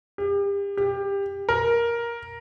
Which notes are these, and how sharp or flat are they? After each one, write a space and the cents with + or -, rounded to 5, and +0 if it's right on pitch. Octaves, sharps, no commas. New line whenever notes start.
G4 +35
G4 +20
A#4 +10